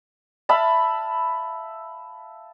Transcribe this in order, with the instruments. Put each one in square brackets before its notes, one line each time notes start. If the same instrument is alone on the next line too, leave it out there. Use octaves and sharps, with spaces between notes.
[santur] E5 F5 A5 B5